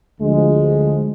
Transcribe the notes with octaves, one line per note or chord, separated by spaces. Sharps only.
D2 F3 G#3